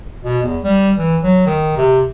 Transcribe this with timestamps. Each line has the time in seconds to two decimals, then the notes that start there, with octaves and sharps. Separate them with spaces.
0.24 B2
0.43 E2
0.63 G3
0.98 E3
1.23 F#3
1.47 D#3
1.77 C3